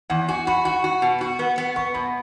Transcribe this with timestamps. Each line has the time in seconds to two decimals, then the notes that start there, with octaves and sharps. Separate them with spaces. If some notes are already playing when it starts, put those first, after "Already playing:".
0.10 E2 F#5
0.29 F#4 G#5
0.47 F#4 B5
0.65 F#4 F#5
0.84 F#4
1.02 B2
1.21 F#4
1.39 B3
1.58 B3
1.76 B3 C#6
1.94 B2 B5